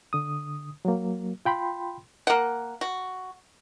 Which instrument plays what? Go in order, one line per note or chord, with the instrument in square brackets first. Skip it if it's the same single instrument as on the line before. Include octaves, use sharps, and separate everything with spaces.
[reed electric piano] D3 D#6
F#3 A#3
F4 G5 B5 C6
[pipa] A#3 F#5
F#4